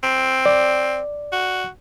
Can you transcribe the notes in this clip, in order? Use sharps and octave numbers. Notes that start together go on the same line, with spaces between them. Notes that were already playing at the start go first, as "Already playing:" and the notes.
C4
D5
F#4